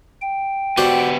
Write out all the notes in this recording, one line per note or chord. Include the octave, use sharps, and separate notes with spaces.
G5
B3 F#4 G4 C5 D5